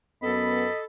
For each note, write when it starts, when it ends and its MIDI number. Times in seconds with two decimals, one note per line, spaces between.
0.23 0.66 42
0.23 0.66 59
0.23 0.84 69
0.23 0.83 75
0.23 0.84 83